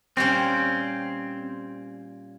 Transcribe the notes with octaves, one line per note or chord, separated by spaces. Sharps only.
A#2 G3 C4 C#4